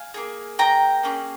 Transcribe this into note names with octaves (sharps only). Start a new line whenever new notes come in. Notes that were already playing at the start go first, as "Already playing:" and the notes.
Already playing: F5 G#5
A#3 F4 G#4
G5 A#5
A#3 C#4 G#4